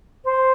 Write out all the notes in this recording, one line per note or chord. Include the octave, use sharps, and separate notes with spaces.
C5